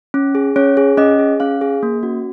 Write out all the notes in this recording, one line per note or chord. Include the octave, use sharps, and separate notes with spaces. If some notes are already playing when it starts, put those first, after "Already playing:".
C#4
G#4
C#4 C#5
G#4
C#4 D#5
G#4
C#4 F5
G#4
A#3
C#4 F#4